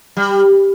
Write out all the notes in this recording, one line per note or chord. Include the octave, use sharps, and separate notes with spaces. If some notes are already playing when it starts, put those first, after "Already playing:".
G3